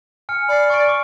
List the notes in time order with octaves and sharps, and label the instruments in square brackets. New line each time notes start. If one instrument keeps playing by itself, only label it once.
[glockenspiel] G#5 F6 C#7
[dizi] D5 [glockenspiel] B5 C7
[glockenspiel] C#6 D7
C#6 D6 D7